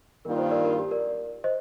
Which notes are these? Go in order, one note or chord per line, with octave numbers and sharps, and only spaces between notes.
G2 D#3 A#3 D4 F4 A#4
C5
A#4 D5
A#4
G4
A#4 D5
C5 D#5